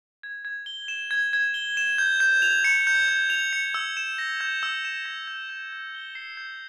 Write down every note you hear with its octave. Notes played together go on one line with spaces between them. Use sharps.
G#6
G#6
G7
E7
G#6
G#6
G7
E7
G6
G6
F7
C#7
G6
G6
F7
C#7
E6
E7
A#6
G6
E6
E7
A#6
G6
G6
G6
G7
C7
G6